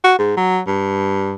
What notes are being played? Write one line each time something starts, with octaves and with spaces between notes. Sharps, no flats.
F#4
G#2
F#3
G2